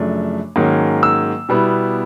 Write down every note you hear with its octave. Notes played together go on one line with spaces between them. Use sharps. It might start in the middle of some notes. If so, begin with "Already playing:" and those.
Already playing: F#2 C#3 F3 A3 D4
G#2 D#3 F#3 A#3 C#4
E6
B2 G3 B3 E4